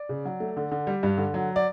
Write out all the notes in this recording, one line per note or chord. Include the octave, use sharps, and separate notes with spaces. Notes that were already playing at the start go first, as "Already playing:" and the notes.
Already playing: D5
C#3
F#3
A3
D3
D3
G3
G2
D3
F#3
D5